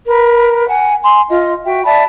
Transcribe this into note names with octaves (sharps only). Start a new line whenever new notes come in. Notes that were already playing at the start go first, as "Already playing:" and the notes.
A#4 B4
F#5 G#5
G#5 C6
F4 D#5
F#4 E5 G5
D5 E5 A5 B5